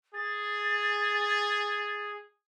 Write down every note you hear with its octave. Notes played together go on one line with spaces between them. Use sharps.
G#4 A6